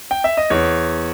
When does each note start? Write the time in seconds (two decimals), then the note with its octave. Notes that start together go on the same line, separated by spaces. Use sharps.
0.11 G5
0.24 E5
0.37 D#5
0.50 E2 C#5